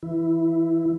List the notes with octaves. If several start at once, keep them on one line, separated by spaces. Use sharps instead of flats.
E3 E4